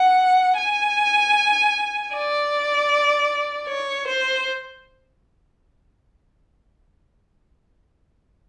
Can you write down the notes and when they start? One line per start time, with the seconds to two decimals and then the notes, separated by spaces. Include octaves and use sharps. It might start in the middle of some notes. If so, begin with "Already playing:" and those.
Already playing: F#5
0.58 G#5
2.13 D5
3.68 C#5
4.07 C5